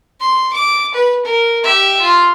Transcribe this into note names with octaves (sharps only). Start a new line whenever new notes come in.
C6
D6
B4
A#4
G4 E5
F4